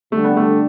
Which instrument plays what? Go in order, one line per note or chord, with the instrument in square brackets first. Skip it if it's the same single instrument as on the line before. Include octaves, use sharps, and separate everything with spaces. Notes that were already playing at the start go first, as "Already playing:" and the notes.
[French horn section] D3 G3 D4 [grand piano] A3
[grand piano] B3
A3